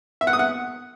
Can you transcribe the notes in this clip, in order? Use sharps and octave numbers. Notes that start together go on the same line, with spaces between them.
E5
F#5
D#6
F#5